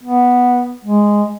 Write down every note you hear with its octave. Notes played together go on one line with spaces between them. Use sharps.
B3
G#3